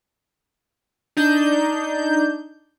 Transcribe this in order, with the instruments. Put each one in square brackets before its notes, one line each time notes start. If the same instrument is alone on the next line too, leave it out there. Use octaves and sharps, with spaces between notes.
[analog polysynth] D4 D#4 G6